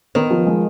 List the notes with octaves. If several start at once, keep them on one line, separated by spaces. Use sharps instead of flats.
D#3 B3
F3
G#3